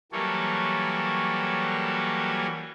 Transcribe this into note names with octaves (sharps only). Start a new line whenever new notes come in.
E3 F#3 G3 A#3 A4 C#5